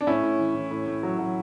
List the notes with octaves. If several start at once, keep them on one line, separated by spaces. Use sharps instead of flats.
D4
A2 C#4 E4
A2
E3
E3
A2
A2
F#3
F#3